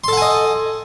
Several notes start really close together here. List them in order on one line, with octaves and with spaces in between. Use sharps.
C6 A4 F#5 G#5 D#5